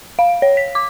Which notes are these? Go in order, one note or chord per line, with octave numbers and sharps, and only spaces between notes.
F5
C#5
B6
D6